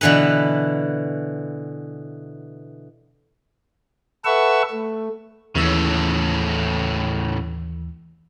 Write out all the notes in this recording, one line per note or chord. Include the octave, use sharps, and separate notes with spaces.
B2 D3 E3 A4 B4
A4 B4 E5 F#5 C#6 E6
A3
D#2 A2 C#3 E3 E6